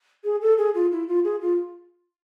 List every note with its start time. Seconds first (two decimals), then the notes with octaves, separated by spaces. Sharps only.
0.24 G#4
0.41 A4
0.57 G#4
0.75 F4
0.92 E4
1.08 F4
1.24 G#4
1.41 F4